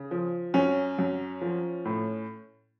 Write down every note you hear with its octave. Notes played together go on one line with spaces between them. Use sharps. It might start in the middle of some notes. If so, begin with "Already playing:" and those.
Already playing: C#3
F3
F#2 C#4
F#2
F3
A2